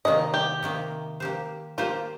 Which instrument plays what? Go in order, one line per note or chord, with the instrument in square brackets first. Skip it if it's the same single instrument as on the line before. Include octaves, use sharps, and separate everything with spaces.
[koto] C3 D#3 A#3 [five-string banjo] D#5
[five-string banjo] G4
[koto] C3 D#3 A#3
A#3 G4 C5
[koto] A#3 G4 C5 [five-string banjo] F4